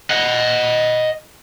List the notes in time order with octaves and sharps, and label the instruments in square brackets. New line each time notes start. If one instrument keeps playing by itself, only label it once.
[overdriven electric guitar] D#5 F#5